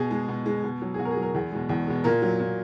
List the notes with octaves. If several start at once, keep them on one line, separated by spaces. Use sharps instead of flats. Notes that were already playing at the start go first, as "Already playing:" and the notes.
Already playing: B2 G#4
G#3
B2
G#3
B2
F#3
G#4
B2 F#4
A#4
G#4
F#3
A#4
E2 G#4
B2 G#3
E2
B2 G#3
A#2 A#4
F#3
A#2